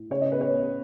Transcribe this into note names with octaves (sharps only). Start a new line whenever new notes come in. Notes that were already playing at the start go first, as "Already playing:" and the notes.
Already playing: A2
C#3 C#5
D#5
B3 B4
C#5
B3